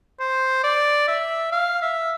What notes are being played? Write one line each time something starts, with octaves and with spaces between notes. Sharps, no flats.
C5
D5
E5
F5
E5